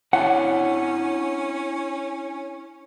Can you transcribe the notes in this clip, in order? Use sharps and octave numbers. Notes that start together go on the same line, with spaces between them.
C#4 D4 E4 C#5 F#5